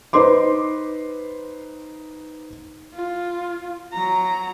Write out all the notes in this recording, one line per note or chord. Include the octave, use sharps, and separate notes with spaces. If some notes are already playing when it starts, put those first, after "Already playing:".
D#4 B4 C5 C6 D6
F4
F#3 A#5